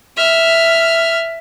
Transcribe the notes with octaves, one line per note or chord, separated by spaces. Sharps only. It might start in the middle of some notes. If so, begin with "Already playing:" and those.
E5 F6